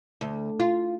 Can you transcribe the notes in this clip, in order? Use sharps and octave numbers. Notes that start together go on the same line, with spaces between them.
D2
F4